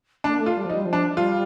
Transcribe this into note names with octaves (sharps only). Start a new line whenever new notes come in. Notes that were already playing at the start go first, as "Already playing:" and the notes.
A3 D4
A#3
A3
F4
G3
F3
D#4
G3
F3
D4
G3 F4